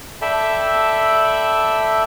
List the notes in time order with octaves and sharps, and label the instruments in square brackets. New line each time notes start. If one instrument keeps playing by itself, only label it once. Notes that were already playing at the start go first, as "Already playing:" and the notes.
[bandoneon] A4 D5 E5 G5 A5 B5